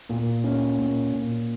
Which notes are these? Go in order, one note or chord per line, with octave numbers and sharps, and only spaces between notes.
A#2
C#4
A#2
A#2